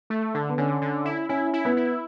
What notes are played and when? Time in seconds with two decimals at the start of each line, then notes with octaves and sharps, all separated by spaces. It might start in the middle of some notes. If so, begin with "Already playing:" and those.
0.10 A3
0.34 D3
0.49 B3
0.58 D3 C#4
0.82 D3
1.05 E4
1.29 C#4 E4
1.54 E4
1.65 B3
1.77 E4